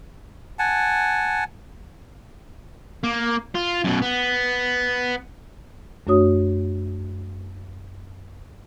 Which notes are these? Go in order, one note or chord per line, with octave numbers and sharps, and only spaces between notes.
F#5 G#5 A5
A#3
F4
F#2 B2
B3
F#2 A3 D4 F#4 C#5 D#6